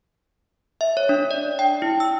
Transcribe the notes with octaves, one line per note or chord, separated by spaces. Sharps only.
E5
C#5
D4
D5
G5
E4
E6